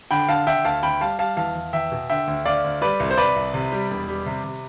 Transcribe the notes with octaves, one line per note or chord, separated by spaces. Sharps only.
D3 G5 B5
D3 F5 A5
D3 E5 G5
D2 F5 A5
D2 G5 B5
G3 F5 A5
G3 F5 A5
E2 F5 A5
E2
E2 E5 G5
B2
D3 E5 G5
D2
D2 D5 F5
D2
G3 B4 D5
C2
C5
C2 B4 D5
C2
C3
G3
E1
G3
C3
C3